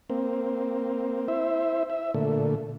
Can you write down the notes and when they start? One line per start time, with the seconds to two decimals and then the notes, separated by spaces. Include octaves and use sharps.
0.10 A#3 C4
1.28 E4 C5 E5
1.90 E5
2.14 A#2 D3 A3